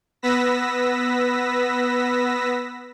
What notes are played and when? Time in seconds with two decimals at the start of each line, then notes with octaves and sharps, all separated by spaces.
0.22 B3 B4 E6 A#6 B6